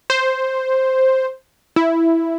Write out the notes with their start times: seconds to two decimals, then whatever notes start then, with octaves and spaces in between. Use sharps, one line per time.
0.10 C5
1.76 E4